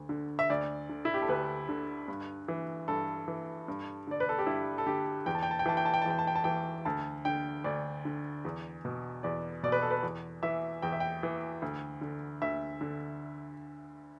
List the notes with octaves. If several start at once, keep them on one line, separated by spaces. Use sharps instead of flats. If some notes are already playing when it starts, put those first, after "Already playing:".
Already playing: D2
D3
E5
D2 D5
D3
E4
G4
A4
D2 B4
D3
G2
E3
G2 A4
E3
G2
D3 D5
B4
A4
G4
G2 E4
A4
D3 G4
E2 G5
A5
G5
A5
G5
E3 A5
G5
A5
G5
A5
E2 G5
A5
G5
A5
E3 G5
D2 A5
D3 G5
D2 D5
D3
E2
B2
E2 D5
B2 D5
B4
A4
B4
E2
E3 E5
E2 G5
E5
G5
E3
D2
D3
D2 E5
D3